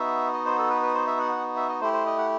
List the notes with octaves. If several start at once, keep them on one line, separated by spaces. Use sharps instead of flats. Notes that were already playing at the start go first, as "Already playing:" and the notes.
Already playing: B3 D#4 F#4 E5
D#5
C5
A4
B4
B4
C5
E5
F#5
F#5
E5
D#5
A3 E4 G4 C5
C5
D#5
F#5